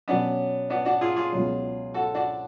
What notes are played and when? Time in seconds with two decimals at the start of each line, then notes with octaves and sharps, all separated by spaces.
0.08 B2 F#3 B3 C#4 D4
0.70 B3 D4
0.85 D4 F#4
1.01 F4 G#4
1.16 F4 G#4
1.32 C#2 B2 F#3
1.94 F#4 A4
2.14 D4 F#4